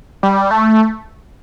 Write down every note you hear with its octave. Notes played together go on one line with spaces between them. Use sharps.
G3
A3